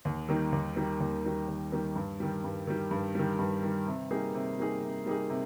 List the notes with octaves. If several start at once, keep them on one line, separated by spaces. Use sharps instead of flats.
D#2
D#3 G3 A#3 D#4
D#2
D#3 G3 A#3 D#4
D#2
D#3 G3 A#3 D#4
D#2
D#3 G3 A#3 D#4
G2
D#3 G3
G2
D#3 G3
G2
D#3 G3
G2
D#3 G3
C3
G3 A#3 D#4 G#4
C3
G3 A#3 D#4 G#4
C3
G3 A#3 D#4 G#4
C3